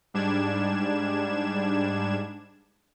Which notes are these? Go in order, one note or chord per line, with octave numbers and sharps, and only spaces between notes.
G#2 G3 D4 G#6 E7